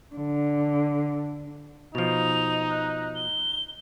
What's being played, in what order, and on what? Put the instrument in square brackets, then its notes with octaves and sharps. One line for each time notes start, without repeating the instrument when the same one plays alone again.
[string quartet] D3
[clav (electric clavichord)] B2 F3 [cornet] D#4 [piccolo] F7
[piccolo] F#6
G7